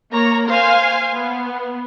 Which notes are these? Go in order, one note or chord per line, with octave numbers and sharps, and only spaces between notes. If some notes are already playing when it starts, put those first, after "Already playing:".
A#3 C#5 A#5
C5 F5 G#5
B3